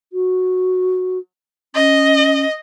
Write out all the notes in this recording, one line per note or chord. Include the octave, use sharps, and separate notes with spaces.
F#4
C#4 D#5